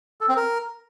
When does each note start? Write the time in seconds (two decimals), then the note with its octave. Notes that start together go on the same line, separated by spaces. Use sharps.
0.21 A4
0.29 C4
0.37 A#4